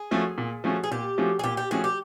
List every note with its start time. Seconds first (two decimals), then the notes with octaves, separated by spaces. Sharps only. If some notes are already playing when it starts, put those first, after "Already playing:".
Already playing: G#4
0.11 F3 A3 C#4 F#4
0.38 A#2
0.64 F3 A3 C#4 F#4
0.84 G#4
0.91 A#2 G4
1.18 F3 A3 C#4 F#4
1.39 G#4
1.44 A#2 G4
1.57 G4
1.71 F3 A3 C#4 F#4 G#4
1.84 G4